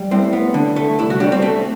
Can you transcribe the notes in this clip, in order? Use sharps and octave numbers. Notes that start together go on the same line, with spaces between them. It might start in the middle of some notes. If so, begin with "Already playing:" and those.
Already playing: G3
A2 C4
B3
D3
A3
C2 E4
F#4
G3 D4
C4
A3